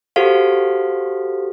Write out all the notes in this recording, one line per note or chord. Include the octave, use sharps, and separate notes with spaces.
F#4 G4 A4 C5 F5